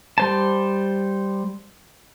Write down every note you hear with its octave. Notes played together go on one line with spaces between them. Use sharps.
G3 C5 A5